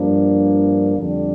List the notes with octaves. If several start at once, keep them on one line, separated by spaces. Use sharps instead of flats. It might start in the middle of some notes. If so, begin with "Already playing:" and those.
Already playing: G2 F3 A#3 D4
F2 D3 G3 D4